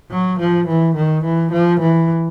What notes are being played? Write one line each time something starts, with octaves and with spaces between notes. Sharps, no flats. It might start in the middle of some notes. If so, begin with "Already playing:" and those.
F#3
F3
E3
D#3
E3
F3
E3